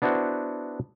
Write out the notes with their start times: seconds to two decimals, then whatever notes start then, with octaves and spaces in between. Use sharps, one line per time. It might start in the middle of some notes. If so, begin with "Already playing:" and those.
0.02 B3 D4 E4 F#4 C5